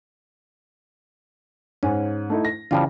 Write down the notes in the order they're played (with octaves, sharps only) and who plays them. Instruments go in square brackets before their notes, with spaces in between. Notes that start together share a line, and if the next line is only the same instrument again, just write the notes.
[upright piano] G#2 [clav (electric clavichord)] C#4
[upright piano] A3 D#4 E4
A#6
[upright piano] C#3 E3 [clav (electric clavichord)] F3 G3 F4